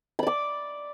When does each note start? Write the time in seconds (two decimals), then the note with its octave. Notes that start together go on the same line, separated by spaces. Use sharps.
0.19 B5
0.23 D5
0.27 D6